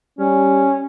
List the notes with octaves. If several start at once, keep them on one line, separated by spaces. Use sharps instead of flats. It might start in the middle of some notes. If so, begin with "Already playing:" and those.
G3 C#4